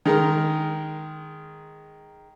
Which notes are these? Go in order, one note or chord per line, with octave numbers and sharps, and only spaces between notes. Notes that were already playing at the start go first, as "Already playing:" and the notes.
D#3 G#3 A#4